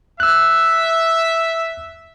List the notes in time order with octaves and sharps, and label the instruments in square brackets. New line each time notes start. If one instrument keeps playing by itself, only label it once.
[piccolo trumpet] E5 [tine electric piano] E6 F#6